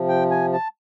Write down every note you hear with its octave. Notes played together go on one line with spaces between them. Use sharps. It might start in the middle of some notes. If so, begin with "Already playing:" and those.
Already playing: C3 F3
G5
G#5
A5